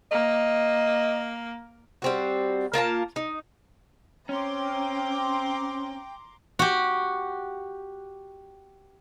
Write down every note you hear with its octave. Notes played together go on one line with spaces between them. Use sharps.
A#3 D#5
G3 C4 F#4
A#3 F4 A#4 A5
D#4
C4 C#4 G5 A#5 C6 D6
F#4 G4